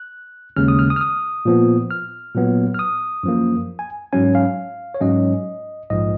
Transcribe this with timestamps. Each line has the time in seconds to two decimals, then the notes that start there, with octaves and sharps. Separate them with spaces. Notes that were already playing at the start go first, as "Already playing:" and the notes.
Already playing: F#6
0.57 D#2 C#3 G#3 C#4 F6
0.68 D#6
0.79 F6
0.90 D#6
0.96 F6
1.01 D#6
1.45 A#2 F3 B3
1.90 F6
2.34 A#2 F#3 B3
2.74 F6
2.79 D#6
3.23 F#2 F3 A#3
3.79 G#5
4.13 G#2 F#3 C#4 G#5
4.35 F5
4.94 C#5
5.01 G#2 F#3 C#4 D#5
5.90 A#1 G#2 F3 D#5